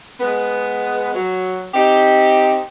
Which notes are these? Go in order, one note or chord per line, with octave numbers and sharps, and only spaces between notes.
G#3 B3
F#3
C4 D#4 G4